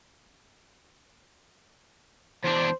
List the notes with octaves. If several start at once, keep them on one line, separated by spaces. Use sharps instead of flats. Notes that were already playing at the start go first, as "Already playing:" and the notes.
E2 D4 C5